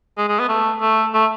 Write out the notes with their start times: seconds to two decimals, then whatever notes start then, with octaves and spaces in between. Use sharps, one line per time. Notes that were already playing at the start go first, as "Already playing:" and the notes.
0.18 G#3
0.28 G#3
0.39 B3
0.49 A3
0.81 A3
1.14 A3